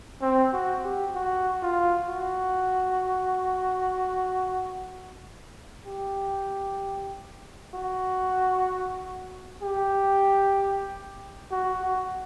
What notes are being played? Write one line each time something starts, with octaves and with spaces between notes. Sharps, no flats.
C4
F#4
G4
F#4
F4
F#4
G4
F#4
G4
F#4
F#4